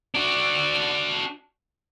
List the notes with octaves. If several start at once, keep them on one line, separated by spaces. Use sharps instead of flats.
D4 F#4